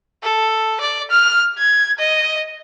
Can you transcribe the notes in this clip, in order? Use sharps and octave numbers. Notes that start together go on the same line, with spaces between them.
A4
D5
F6
G#6
D#5